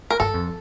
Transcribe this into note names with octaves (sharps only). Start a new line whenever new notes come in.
A#4
G2 A4
F2